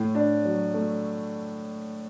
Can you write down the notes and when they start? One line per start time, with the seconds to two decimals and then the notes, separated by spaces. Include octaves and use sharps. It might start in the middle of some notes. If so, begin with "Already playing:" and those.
Already playing: A2
0.15 D4
0.45 F#3
0.74 A3